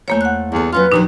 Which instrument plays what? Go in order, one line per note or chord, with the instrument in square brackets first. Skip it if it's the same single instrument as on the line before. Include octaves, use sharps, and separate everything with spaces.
[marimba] E2 A#3 C#5 [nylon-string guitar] A3 C5 F5
[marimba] F#5 F#6
[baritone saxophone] E2 [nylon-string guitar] G2 A4
[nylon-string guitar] F#3 C#4 F5 [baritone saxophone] F4 [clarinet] B4 [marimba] F6
[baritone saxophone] D#2 [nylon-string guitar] A#2 F3 F#3 [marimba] D4 D#4